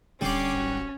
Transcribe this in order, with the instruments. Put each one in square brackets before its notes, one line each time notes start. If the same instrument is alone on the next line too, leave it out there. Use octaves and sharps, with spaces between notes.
[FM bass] D1 [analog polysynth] D3 D6 C7 [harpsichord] G3 D5 [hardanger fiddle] C#4
[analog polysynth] G#1 F#4